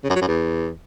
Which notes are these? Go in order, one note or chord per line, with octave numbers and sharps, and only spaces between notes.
C#3
F#2
F#3
F#2
E2